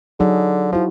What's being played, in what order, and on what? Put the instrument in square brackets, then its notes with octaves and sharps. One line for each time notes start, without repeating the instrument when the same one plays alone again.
[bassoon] D3 [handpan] F#3 D#4 G#4
[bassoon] F3 [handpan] E4 F#4